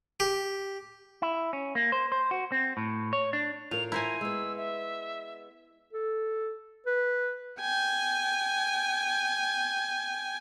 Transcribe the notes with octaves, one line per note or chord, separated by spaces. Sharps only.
G4
E4
C#4
A#3
C5
C5
F#4
C4
A2
C#5
D4
A2 F4 A#4 F7
E4 C5 G#5 A#5
G#3 B3 E6
E5
A4
B4
G5 G#5